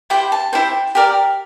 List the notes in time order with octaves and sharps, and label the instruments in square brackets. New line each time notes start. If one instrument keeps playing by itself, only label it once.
[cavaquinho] E4 G4 C5 G5
A5
E4 G4 C5
G4 A#4 D5